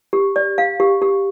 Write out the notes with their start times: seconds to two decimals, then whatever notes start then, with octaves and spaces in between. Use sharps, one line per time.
0.13 G4
0.36 D5
0.58 F5
0.80 G4
1.02 G4